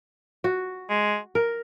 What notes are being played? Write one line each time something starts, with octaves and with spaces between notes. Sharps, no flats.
F#4
G#3
A#4